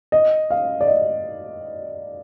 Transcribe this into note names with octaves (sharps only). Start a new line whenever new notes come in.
D#5
F5
D5
D#5